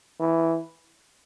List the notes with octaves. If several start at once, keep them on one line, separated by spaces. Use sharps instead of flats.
E3